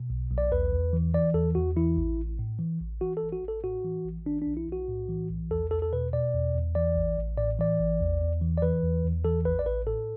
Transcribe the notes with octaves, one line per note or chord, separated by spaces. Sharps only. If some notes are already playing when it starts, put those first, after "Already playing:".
Already playing: B2
B1
B1
D5
E2 B4
E2
E3
E3 D5
E2 A4
E2 F#4
E3 E4
A1
A1
A2
E3
A1
E3 F#4
A4
A1
F#4
A1
A4
A2 F#4
E3
A1
E3 D4
B1 D4
E4
B1 F#4
A2
E3
B1
E2 A4
E2 A4
A4
B2 B4
B2 D5
E2
E2
E3 D5
A1
A1
A2 D5
E3 D5
A1
E2
E2
E3
D5
E3 B4
E2
E2
E3 A4
A1 B4
D5
A1 B4
A2 A4